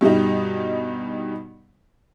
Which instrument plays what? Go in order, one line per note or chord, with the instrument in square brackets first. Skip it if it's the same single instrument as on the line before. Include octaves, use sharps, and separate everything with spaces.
[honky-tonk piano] G2 B2 G3 D#4